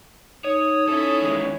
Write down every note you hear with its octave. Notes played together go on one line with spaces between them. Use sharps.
D#4 C#5 D#6
C#4 E4 A4
E2 D#3 G#3